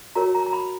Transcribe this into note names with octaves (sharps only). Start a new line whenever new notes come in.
F#4 A#4 C#5 A#5
A#5
A#5
B5